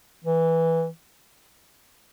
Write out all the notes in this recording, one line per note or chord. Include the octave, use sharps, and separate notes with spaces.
E3